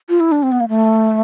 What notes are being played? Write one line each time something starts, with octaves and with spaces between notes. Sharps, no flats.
F4
E4
D4
C4
B3
A#3
A3